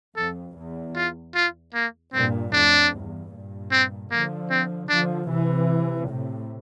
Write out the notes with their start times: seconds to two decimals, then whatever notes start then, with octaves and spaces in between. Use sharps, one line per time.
0.16 F2 A4
0.56 E2
0.96 F4
1.35 F4
1.74 A#3
2.14 G2 A#2 C4
2.53 F2 A2 D4
2.93 E2 G2
3.31 G2 A#2
3.71 C4
4.11 D3 F3 A#3
4.51 C4
4.89 D3 F3 D4
5.29 C3 E3
6.08 A2 C3